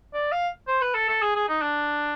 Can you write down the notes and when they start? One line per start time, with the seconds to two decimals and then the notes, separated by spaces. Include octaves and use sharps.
0.14 D5
0.32 F5
0.68 C5
0.82 B4
0.95 A4
1.09 A4
1.22 G#4
1.35 G#4
1.49 D#4
1.62 D4